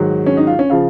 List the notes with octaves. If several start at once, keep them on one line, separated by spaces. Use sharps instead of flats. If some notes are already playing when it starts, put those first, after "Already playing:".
Already playing: G#2 D#3 F#3
C#4
D#4
F4
C#4
C#3 F3 F4